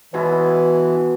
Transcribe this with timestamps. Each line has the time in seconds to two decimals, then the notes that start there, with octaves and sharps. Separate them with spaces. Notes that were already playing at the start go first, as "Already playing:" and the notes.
0.14 B2 E3 G#3 E4 B4